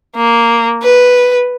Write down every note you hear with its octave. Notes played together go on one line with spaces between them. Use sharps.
A#3
B4